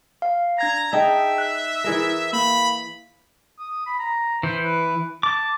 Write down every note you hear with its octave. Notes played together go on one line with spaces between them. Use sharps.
F5
D4 A#5 G#6 A#6
D#4 G#4 E5 G5 A5
F#6 B6
E3 G#4 A#4
A#3 B5
D#6
B5
A#5
E3 C5
B4
A5 D6